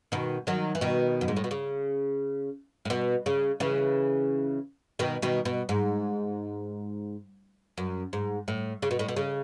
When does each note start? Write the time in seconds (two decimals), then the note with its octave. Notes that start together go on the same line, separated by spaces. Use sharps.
0.12 B2 D#3
0.47 D#3 F#3
0.75 E3
0.81 B2 D#3
1.21 F#2
1.28 G#2
1.36 A2
1.44 B2
1.51 C#3
2.85 A2
2.90 B2
3.26 C#3
3.60 C#3 E3
4.99 B2 D#3
5.22 B2 D#3
5.45 B2
5.69 G#2
7.78 F#2
8.13 G#2
8.48 A2
8.82 C#3
8.91 B2
8.99 A2
9.08 B2
9.16 C#3